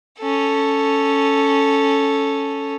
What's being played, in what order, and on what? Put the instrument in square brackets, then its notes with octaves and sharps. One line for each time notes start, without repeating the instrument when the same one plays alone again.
[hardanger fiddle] C#4 A4